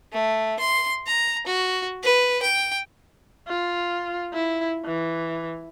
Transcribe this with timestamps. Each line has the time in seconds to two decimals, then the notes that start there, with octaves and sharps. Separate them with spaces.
0.12 A3
0.59 C6
1.06 A#5
1.46 F#4
2.02 B4
2.42 G5
3.47 F4
4.33 E4
4.85 E3